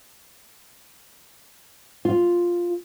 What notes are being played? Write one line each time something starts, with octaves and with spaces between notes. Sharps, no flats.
F4